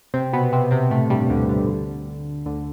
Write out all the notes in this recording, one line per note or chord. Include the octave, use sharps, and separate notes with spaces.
C3 C4
B2 B3
C3 C4
C3 C4
A2 A3
G2 G3
D2 D3
D2 D3
D2 D3